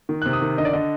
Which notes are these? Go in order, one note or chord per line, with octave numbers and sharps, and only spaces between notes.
D#3
C3 F#6
D#6
D#3
D3 D#5
D5
D3 D#5